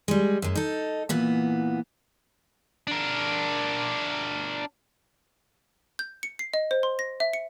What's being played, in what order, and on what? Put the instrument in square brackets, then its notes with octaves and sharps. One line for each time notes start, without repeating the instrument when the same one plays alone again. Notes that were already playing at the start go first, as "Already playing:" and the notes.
[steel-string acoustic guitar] G3 G#3
F#2 G#3
D#4 A4
A#2 E3 B3
[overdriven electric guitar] D4 A#4
[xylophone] G6
C#7
C7
D#5
C5
C6
A#6
E5
C#7